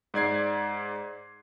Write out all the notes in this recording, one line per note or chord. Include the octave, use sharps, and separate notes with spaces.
G#2 D5 G#6 C7